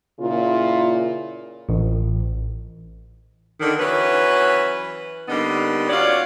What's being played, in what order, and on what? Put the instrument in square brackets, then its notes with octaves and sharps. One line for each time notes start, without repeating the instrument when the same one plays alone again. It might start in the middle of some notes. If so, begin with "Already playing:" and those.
[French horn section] A#2 C#3 E4 F4
[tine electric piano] A1
[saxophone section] D3 D#3
E3 F#3 C#4 B4
D3 G3 A#3 B3 D#4
C#4 F4 F#4 C#5 D5